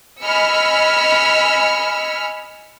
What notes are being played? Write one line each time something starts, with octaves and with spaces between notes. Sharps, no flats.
D#5 G#5 B5 E6 F6 C#7